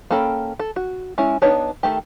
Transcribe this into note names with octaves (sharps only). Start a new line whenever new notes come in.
A#3 C#4 A4 G5 B5
A4
F#4
G#3 C#4 E4
B3 D4 D#4 C#5
D#3 A3 G4